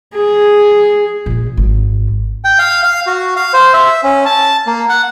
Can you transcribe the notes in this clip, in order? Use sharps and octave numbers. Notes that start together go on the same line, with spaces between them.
G#4
A#1 A#2
G#1
G5
F5
F5
F#4
F5
C5
E5
C#4
A5
A#3
F#5